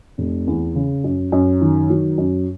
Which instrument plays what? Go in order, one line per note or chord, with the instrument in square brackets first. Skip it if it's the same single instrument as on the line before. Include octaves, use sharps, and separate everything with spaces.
[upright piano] F1
E2
C#3
F#2
F#2
D#3
F#3
F#2